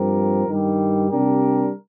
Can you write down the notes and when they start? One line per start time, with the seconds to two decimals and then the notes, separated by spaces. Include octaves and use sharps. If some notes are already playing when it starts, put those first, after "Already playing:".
Already playing: G2 F3 C4 G4 A#4
0.47 G2 D#3 G3
1.09 C3 G3 D4 G4 A#4